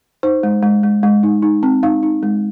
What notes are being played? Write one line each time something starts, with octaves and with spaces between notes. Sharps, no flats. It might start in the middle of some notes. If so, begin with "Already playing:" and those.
D#4 C5
G#3
G#3
G#3
G#3
D#4
D#4
C4
D#4 F5
D#4
G#3